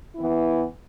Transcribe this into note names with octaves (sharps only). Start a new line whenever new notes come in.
E3 B3 E4